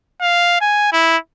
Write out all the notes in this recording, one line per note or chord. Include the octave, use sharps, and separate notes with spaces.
F5
G#5
E4